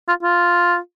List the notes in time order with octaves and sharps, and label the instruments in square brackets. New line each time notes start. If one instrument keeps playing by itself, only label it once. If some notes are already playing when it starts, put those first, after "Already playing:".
[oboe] F4
F4